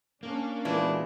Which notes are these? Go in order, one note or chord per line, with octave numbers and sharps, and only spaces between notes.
A#3 C#4 D4
A#2 E3 G#3 B3 D4 F#4